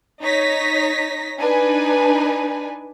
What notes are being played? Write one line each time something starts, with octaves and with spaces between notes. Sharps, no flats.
D#4 C#5 A#6 B6
D4 D#4 B4 G#5